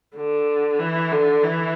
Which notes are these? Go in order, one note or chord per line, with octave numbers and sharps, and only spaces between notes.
D3
E3
D3
E3